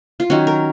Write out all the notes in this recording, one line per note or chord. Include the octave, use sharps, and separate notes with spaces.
F4
D#3 F#3 C#4 F#4
A#4